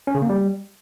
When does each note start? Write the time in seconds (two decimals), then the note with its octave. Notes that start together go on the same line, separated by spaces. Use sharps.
0.07 C#4
0.15 C#3
0.22 A#3
0.29 G3